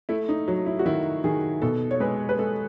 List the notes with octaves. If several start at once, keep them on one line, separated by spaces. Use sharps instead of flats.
A3 E4
D#4
F#3
E4
F#4
D#3 E4
D#3 G#4
B2 A4
C#5
G#3 B4
B4
G#3 A4